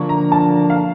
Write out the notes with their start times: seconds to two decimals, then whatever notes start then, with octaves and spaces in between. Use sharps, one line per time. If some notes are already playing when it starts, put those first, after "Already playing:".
Already playing: D3 F3 A#3 D4 C#6
0.09 A#5
0.32 A5
0.70 F5